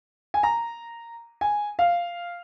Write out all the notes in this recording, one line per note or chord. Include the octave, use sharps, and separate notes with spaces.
G#5
A#5
G#5
F5